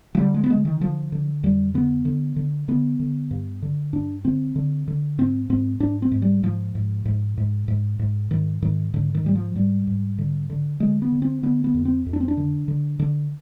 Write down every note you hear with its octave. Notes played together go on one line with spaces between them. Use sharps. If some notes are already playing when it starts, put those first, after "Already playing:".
F3
D3 G3
G#3
B3
D3 G#3
D#3
D3 F3
D3
F2 G3
D3 B3
D3
D3
D3 B3
D3
G2
D3
G2 D4
D3 C4
D3
D3
G#2 C4
G#2 C4
G#2 D4
C4
G#2
G3
G#2 F3
G#2
G#2
G#2
G#2
G#2
G#2 D#3
G#2 D#3
G#2 D3
D#3
G#2 G3
F3
G#2 G3
G#2
D3
D3
D3 G#3
B3
D3
C4
D3 B3
B3
F2
C4
F2
D4
C4
D4
D3
D3
D3